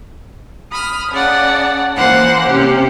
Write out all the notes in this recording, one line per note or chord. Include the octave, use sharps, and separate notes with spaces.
B5 D#6 F6
C#3 D5 F#5 A5
E3 A#3 C5 F#5 F#6
C3 C#4 G4